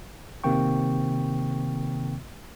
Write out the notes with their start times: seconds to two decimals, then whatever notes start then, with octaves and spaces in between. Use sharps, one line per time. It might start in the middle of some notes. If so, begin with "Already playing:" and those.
0.44 C3 D#3 A#3 C4 G5 C#6